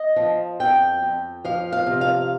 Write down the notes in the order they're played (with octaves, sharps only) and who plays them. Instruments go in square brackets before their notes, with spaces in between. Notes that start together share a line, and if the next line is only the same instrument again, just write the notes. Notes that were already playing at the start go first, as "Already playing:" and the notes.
Already playing: [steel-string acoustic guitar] D#5
F3
F2 G5
F2
F3 F5
F5
C3
F5